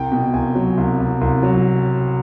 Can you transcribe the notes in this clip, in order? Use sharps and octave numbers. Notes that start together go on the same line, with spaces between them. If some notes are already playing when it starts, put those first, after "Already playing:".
Already playing: C2 G5
B2
C2 G#5
F#3
C2
C2
C2
F#3